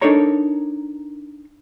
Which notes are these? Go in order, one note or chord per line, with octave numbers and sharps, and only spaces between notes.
D4 D#4 A4 A#4 C#5 A#5